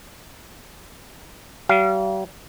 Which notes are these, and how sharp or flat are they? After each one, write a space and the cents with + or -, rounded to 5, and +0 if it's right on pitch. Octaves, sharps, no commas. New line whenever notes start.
G3 -40 F5 -35